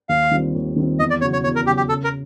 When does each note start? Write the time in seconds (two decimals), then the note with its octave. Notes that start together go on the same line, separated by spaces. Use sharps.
0.09 D#2 F5
0.31 D#3 G3 C4 F4
0.55 D#2
0.76 D#3 G3 C4 F4
0.99 E2 D#5
1.10 D5
1.21 C#3 F#3 C#5
1.33 C#5
1.44 E2 C#5
1.56 A#4
1.66 C#3 F#3 G4
1.77 G4
1.89 C#3 A4
2.04 A#4